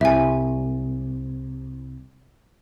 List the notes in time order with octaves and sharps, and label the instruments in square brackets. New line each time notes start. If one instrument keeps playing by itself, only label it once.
[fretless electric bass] C2 [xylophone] E5 G#5